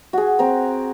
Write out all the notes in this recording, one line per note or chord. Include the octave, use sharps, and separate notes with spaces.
F#4 G#4
C4 A#5